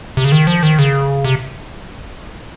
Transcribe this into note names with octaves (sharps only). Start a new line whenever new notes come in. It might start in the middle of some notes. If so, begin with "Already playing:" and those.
C3
C#3
D#3
F3
D#3
C#3
C3